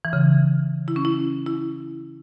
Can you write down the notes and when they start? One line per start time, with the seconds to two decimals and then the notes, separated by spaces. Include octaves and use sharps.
0.05 E3
0.13 C#3
0.88 E4
0.96 C#4
1.05 E4
1.47 E4